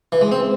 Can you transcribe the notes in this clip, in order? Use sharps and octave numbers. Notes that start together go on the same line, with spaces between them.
E3
G#3
C4